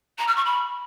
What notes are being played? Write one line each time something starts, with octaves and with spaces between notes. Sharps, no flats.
A#5
F6
C#6
B5